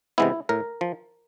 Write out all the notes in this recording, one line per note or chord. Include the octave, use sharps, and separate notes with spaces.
C3 E3 G#3 B3 E4
A2 A#4
F3